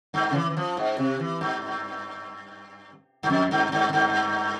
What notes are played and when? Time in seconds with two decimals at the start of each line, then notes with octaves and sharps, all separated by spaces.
0.14 G2
0.31 C#3
0.35 E3
0.50 E3
0.57 F3
0.77 G#2
0.98 C3
1.20 E3
1.41 G2
3.23 G2
3.30 F2
3.51 G2
3.72 G2
3.93 G2